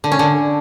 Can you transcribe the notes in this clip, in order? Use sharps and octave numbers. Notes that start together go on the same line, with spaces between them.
D3
C#4
D3